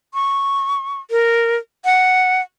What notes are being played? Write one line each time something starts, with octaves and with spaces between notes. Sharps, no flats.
C#6
A#4
F#5